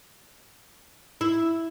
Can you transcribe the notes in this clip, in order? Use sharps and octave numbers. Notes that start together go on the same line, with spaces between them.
E4